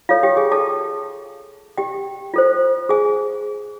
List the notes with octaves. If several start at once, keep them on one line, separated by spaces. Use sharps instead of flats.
F4 A4 C#5 F5
G4 G5
G#4 G#5
A4 A5
G4 G5
F4 A4 C5
G#4 G#5